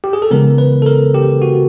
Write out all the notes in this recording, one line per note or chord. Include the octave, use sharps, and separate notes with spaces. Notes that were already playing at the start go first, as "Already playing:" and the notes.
G4
G#4
A4
C#3 E3 G#3 B3 A#4
B4
A4
A#4
G4
F#4